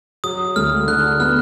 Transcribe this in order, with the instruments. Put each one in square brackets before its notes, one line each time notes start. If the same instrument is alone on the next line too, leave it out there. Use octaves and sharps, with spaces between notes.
[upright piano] F#3 [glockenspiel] D#6
[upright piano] D2 [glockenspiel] F6
[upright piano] D3 [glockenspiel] F#6
[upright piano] B3 [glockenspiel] F6